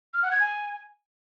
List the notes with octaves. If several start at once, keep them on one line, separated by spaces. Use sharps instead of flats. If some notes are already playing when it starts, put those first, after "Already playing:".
F6
F#5
G#6
G#5